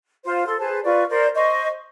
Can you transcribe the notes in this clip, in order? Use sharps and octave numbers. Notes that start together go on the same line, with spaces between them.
F4 C5
A4 C6
G#4 B4 C5 A5
F4 B4 D5 C#6
A#4 C5 D5
C5 D#5 C#6